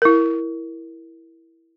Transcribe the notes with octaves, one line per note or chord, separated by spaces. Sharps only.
E4 A#4